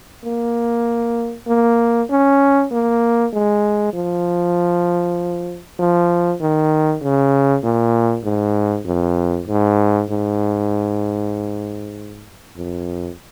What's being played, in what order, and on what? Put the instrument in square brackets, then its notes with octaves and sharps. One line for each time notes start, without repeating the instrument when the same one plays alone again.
[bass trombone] A#3
A#3
C#4
A#3
G#3
F3
F3
D#3
C#3
A#2
G#2
F2
G#2
G#2
F2